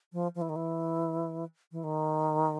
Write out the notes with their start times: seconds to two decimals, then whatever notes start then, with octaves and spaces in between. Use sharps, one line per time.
0.13 F3
0.35 F3
0.41 E3
0.49 D#3
0.56 E3
1.72 E3
1.84 D#3